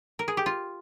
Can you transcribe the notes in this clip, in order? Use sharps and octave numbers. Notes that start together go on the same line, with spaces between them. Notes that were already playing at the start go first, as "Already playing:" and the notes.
A#4
G#4
G4
F4